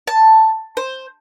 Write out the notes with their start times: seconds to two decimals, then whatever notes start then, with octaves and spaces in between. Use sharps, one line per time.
0.07 A5
0.77 C5